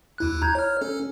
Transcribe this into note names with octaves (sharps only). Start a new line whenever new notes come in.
D#2 E4 F#6
A#5 G6 G#6
C#5 F6
C#4 A4